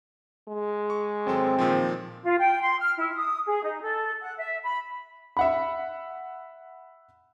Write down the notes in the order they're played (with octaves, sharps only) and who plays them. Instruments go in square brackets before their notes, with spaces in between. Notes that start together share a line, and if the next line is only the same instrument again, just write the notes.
[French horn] G#3
[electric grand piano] C#6
[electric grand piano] G#1 F#3 A4 [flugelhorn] C4
[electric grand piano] A#2 D#3 F3
[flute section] F4
G5
C6
F6
E4
D#6
G#4
D#4
A4
F#5
E5
B5
[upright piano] E5 F#5 B5